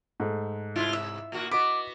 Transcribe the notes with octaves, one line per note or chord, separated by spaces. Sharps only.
G#2 A3
C3 E4 F4
C3 E5
A#2 A#3 F#4
B3 F#4 D#5 D6 B6